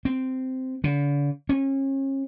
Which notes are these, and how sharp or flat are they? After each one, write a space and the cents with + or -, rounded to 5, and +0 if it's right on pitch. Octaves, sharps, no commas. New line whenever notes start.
C4 -10
D3 -40
C#4 -35